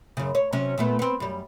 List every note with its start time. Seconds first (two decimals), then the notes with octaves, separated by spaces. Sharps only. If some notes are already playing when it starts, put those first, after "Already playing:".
0.17 F#2 C#3
0.35 C#5
0.53 C3 F#3 C#4
0.78 A#2 A3 B3
0.99 B3 C4
1.20 F#2 G3